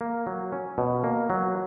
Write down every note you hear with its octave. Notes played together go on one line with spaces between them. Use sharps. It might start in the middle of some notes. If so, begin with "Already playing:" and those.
A#3
F#3
C#4
B2
A#3
F#3